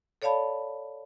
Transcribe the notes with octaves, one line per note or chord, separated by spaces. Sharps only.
A4 C#5 D5 F5 A5 B5